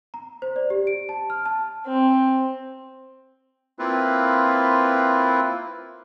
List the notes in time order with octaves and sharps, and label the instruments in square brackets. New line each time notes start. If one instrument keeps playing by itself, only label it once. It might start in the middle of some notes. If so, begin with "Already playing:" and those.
[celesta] A#5
C5
D5
G4
D7
A5
F6
A5
[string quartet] C4
[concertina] A#3 C4 E4 F4 B4